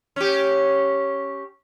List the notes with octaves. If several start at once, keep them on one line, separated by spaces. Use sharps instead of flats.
C#4 G4